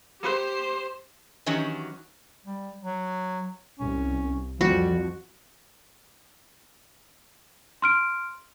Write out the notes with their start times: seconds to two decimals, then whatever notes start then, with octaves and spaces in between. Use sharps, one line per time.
0.22 G4 C5
1.46 D#3 E3 F#3 C#4 F#4 G4
2.45 G3
2.81 F#3
3.79 C2 C#4
4.61 F2 F3 G3 F#4
7.82 C6 F6 D7